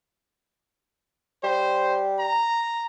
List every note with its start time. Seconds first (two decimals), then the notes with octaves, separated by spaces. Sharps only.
1.44 G3 C5
2.19 A#5